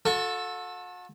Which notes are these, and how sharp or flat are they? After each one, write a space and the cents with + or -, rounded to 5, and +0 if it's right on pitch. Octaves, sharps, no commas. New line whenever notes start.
F#4 -45 A4 +0 C#6 +15